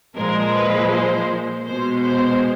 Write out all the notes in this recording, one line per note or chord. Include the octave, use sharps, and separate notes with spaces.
A#2 F3 G#3 A#4
B4
C5
B2 G#3 C5
C5